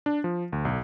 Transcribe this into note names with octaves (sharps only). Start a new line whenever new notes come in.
D4
F3
D2
B1